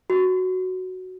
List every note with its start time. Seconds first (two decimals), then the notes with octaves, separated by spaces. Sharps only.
0.10 F#4